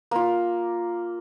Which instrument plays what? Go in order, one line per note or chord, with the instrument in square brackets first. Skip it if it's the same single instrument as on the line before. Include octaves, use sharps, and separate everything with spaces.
[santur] A#3 F4